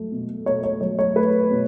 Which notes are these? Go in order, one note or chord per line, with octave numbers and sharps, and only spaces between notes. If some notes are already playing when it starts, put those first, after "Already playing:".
Already playing: F#3 A3
B2
B2 C#5
C#5
F#3 C#5
C#5
A3 B4
B2